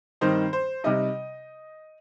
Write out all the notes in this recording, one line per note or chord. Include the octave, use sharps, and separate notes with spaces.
G2 D#3 C4 D#4 C5
C5
C3 G3 D#4 D#5